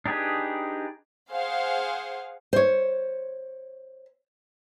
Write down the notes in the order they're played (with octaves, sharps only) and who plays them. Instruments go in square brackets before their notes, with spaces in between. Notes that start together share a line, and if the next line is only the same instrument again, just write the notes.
[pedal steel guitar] D4 D#4 G4 G#4 B4
[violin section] G#4 C5 F5 F#5
[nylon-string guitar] C5 C#5